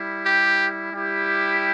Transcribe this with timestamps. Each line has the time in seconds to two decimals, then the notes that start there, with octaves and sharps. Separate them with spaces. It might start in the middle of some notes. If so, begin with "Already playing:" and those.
Already playing: G3 E4
0.26 G4
0.93 G3 E4 G4